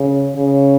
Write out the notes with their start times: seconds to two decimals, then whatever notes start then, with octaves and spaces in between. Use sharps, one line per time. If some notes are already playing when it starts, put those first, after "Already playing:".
Already playing: C#3
0.36 C#3